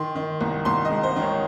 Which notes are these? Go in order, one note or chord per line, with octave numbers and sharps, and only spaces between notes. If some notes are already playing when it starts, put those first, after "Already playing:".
Already playing: D#3 C6
D#3
C2
C2 C6
D#5
G#3
C5
D#3
C#5